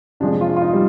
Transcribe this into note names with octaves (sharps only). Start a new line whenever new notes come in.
F2 C3 F3 G#3 D4
F4
F4
D#4
G3